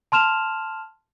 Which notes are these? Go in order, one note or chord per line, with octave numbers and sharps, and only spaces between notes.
A5 C6 F6 E7 F7